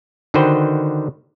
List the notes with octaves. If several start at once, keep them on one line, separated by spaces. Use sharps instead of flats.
D3 D#3 F#4 B4 C5 G5